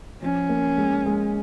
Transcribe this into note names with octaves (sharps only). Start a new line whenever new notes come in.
F3 C#4
A#3
G#3
G#3